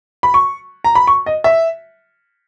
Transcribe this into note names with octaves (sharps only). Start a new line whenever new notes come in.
B5
C#6
A#5
B5
C#6
D#5
E5